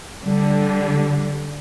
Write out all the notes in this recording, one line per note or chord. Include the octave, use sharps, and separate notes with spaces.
D3 G3